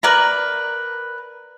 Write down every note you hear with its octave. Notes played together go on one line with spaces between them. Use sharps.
A#4 B4 D5 A#5